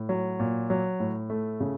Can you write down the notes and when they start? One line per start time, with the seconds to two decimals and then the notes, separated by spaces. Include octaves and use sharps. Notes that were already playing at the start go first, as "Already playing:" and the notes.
Already playing: A2
0.09 F#3
0.40 A#2
0.70 F#3
1.00 A2
1.30 A3
1.60 C#3